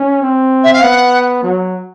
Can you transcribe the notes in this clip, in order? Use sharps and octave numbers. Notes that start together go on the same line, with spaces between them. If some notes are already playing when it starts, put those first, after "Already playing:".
Already playing: C#4
C4
E5
F5
B3 F#5
F#3